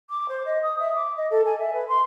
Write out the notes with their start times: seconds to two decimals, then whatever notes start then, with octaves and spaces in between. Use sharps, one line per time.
0.10 D6
0.29 C5
0.45 D#5
0.62 D#6
0.79 E5
0.95 D6
1.16 D#5
1.30 A4
1.46 G#5
1.59 E5
1.73 B4
1.88 C6